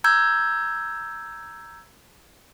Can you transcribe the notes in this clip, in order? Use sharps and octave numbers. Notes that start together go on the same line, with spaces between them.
A#5 E6 G6 G#6